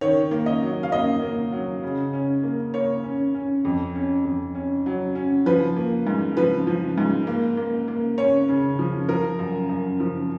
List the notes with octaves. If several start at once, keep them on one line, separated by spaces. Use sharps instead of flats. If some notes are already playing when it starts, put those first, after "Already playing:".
D#3 C#5
A#3
D#5
F#3
F5
A#3 D#5
A#3
F#3
C#3
C#4
A#3
A#3 C#5
C#4
C#4
F2
C#4
F2
C#4
F#3
C#4
F3 B4
A#3
G#2
F3 B4
F3
G#2
A#3
A#3
A#3
C#4 C#5
C#3
F3
F3 A#4
F#2
F#2
F3